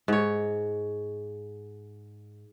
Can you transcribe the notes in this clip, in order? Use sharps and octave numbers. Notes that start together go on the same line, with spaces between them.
G#2 C#5